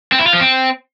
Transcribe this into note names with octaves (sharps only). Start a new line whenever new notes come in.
C4
E4
F4
F3
C4